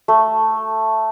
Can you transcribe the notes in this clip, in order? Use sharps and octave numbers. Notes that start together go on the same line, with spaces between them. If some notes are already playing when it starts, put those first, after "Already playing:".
A3